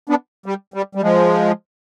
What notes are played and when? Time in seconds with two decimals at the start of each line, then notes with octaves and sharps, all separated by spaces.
0.09 B3 D4
0.46 G3
0.74 G3
0.95 G3
1.02 F3 G#3